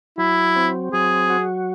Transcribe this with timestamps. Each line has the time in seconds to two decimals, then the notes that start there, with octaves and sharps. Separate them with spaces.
0.18 F#3 E4
0.56 C4
0.93 F#3 G#4
1.30 F#4